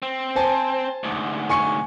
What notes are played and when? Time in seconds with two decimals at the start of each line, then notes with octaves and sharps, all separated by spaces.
0.03 C4
0.36 C5 G#5 A5
1.04 D2 G#2
1.49 G#5 C#6 C#7